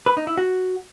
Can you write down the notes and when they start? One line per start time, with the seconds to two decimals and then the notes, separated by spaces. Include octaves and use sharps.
0.06 B4
0.17 D#4
0.27 E4
0.37 F#4